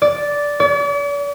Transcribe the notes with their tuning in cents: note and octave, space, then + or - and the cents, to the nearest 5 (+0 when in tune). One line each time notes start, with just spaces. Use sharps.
D5 -10
D5 -45